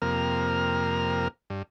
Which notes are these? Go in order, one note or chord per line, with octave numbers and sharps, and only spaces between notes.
F2 C3 A#3 A#4 F6
G2